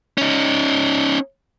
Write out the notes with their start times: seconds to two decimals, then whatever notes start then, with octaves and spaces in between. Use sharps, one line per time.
0.18 C#4 D#4